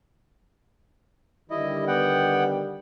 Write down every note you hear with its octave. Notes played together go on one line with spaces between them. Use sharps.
D3 D#3 G3 E4 D#5
B3 F#5 G5